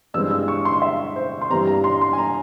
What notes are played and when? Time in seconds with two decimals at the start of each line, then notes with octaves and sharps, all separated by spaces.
0.14 G2 E3 G#3 C4 E6
0.31 E6
0.48 C#6
0.65 C6
0.82 E5
1.16 C5
1.42 C6
1.50 G2 E3 G3 C4 A#5
1.68 A#5
1.84 C6
2.02 C6
2.13 G#5
2.18 A#5